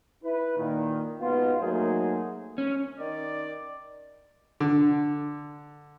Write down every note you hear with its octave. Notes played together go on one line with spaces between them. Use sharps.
E4 B4
A#2 D#3
G#2 B2 B3 F4
F#3 A3 A#3 D#4 G#4 C5
C#4
D#3 D5
D3